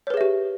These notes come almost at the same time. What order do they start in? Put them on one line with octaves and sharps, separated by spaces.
C#5 B4 G#4 E5 G4